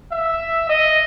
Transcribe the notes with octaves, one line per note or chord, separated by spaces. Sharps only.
E5
D#5